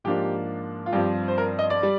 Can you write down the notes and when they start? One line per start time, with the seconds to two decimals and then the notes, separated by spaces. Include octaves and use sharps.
0.04 G#2 F3 A#3 D4 G4
0.86 F4
0.93 G2 F3 C4 G4
1.28 C5
1.38 A#4
1.59 D#5
1.70 D5
1.83 G3